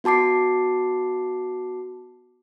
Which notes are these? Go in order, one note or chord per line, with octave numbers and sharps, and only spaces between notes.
B3 F#4 A5 D6 C7